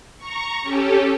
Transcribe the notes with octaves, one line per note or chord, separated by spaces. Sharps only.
A#5 C#6
C#4 G4 A4